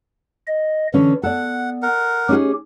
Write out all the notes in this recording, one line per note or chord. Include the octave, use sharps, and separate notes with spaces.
D#5
D3 E3 C#4
B3 A4 D5 F#5
A#4 F#5
C#4 D#4 G4 G#4